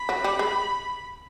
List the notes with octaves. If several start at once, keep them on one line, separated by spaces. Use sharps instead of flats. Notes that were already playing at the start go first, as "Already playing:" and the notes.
Already playing: B5
F#3
G3
G#3